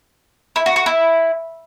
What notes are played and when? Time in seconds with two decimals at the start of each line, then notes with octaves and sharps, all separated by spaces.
0.56 E4
0.66 F#4
0.76 F#4
0.86 E4